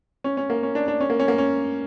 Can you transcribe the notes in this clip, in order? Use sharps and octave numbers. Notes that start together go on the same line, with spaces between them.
C#4
C#4
A#3
C#4
D4
D4
C#4
A#3
C#4
A#3
C#4